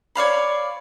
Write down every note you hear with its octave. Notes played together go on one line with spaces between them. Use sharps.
C#5 D5 F5 B5